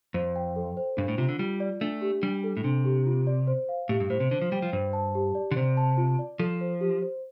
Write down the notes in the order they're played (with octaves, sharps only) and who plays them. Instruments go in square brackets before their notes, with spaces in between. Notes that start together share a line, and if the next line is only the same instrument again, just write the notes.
[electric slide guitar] F2 [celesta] C5
[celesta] G5
A4
C5
[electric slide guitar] G2 [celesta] D4
[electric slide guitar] A2
[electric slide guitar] C3 [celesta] F4
[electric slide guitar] D3
[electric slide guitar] G3 [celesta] F4
[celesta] D5
[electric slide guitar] A3 [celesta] D4
[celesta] G4
[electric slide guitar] G3 [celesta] D4
[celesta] A4
[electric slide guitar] A2
[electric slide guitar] C3 [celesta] D4
[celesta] G4
F4
D5
C5
F5
[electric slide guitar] A2 [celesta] G4
[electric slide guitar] G2
[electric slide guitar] A2 [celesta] C5
[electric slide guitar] C3
[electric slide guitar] D3 [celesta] C5
[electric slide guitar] F3
[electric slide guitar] G3 [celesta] G5
[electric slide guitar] F3
[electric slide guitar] G2 [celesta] C5
[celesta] A5
G4
D5
[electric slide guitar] D3
[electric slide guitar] C3 [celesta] C5
[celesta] A5
F4
D5
[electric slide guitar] F3 [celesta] A4
[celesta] C5
G4
C5